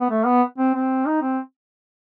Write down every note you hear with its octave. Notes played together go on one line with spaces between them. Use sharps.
B3
A3
B3
C4
C4
D#4
C4